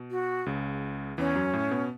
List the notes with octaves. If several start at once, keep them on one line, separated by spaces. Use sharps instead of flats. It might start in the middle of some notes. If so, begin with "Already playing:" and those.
Already playing: B2
F#4
C#2 C#3
E2 E3 C#4
F#2 F#3
A2 A3
B2 B3